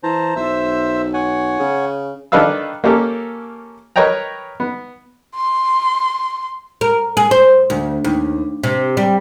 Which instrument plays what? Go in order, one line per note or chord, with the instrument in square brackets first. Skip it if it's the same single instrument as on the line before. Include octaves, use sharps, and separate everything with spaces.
[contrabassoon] E3 [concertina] C5 A5 A#5
[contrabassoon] B1 [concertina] C5 E5 E6
[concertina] C#5 F#5 G#5
[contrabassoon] C#3
[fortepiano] D#3 D4 A4 B4 F5 E6
A#3 C#4 G4 A4 A#4
A#4 B4 C#5 D#5 G5 A#5
B3
[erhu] C6
[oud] A#4
G#4
C5
D2
D#2
C3
G3